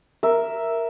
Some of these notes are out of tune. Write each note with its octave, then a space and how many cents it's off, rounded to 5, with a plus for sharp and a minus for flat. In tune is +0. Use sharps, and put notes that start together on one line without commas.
A#4 +0 E5 +0